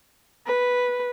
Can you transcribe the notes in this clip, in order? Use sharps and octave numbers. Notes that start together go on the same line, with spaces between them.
B4